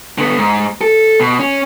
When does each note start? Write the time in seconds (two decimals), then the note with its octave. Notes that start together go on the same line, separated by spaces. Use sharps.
0.18 D3 B3
0.37 G#2
0.81 A4
1.20 B2
1.40 C#4